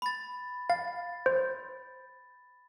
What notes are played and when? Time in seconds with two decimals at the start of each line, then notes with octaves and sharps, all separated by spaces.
0.02 B5 A6
0.70 F5 A6
1.26 C5